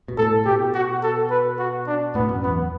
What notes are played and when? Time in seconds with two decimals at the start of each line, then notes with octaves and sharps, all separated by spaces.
0.08 B2
0.18 A2 A4
0.45 B2 G4
0.74 F#4
1.03 A4
1.30 B4
1.59 F#4
1.87 D4
2.15 A2 B3
2.29 F#2
2.43 E2 B3